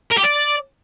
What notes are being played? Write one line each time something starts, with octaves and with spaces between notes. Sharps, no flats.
A#4
G4
D5